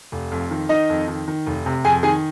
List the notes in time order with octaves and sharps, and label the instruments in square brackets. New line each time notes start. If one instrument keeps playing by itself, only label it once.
[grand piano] F1
F2
D#3
D#3 D#4 D#5
F2
D#3
D#3
F1
C3
F2 G#4 G#5
D#3 G#4 G#5